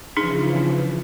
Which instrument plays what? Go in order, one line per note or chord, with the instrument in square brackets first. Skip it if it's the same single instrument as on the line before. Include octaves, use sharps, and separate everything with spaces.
[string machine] C#3 E3 F3 [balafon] D4 D#4 G#4